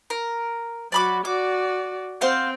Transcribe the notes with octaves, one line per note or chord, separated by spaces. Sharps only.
A#4
F#3 F#4 D5 B5 D6
F#4 D5 D6
C4 C5 F5 F#5